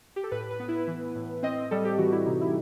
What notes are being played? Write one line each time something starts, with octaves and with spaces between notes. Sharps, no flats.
G4
A4
A2 B4
B4
B3
E4
E3 E4
A2
C4 D#5
G3 A4
G4
E3 F#4
E4
C3 D#4
E4